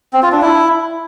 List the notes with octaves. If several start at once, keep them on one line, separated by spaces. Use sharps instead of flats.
C4
F4
D4
E4